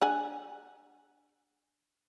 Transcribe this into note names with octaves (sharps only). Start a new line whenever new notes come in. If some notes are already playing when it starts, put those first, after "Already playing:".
D4 F#5 G#5